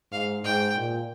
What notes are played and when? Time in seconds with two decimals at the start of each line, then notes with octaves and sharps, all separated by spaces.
0.12 G#2 F5
0.44 G#2 G5
0.76 A#2